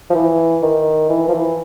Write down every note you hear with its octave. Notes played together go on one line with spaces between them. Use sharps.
F3
E3
D#3
E3
F3
E3